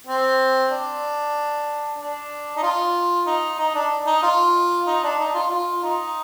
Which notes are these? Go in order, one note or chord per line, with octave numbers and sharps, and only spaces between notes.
C4
D4
D4
D#4
F4
D#4
D#4
D4
D#4
F4
D#4
D4
D#4
F4
F4
D#4